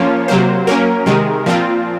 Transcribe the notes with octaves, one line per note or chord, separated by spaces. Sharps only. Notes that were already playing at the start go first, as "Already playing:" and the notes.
Already playing: F3 A#3 C#4 F4 C#5
C3 F#3 A#3 C5
F#3 A#3 C#4 A#4
C3 D#3 G#3
A#2 F3 C4 F4